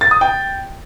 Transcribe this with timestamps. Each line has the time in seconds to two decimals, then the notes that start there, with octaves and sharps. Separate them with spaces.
0.01 A6
0.11 D#6
0.21 G5